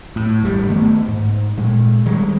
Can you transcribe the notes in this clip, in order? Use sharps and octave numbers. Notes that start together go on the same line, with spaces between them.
A2
G#1 G2 G3
D#3 A3 B3
G#2
A#2 G#3
D#3 G3 G#3